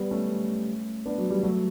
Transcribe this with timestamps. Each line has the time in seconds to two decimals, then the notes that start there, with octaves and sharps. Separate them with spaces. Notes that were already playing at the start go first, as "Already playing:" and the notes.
Already playing: G3 B3
0.11 A3 C#4
1.06 B3 D4
1.18 F#3
1.30 G3
1.43 F#3 A3